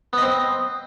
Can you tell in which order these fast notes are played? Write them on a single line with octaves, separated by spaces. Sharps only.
B3 D#5 C4